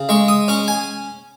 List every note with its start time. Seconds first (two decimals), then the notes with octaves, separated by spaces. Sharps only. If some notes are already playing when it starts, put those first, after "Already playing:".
Already playing: C#3
0.09 G#3 C#6
0.28 D#6
0.48 C#4 C#6
0.68 G#5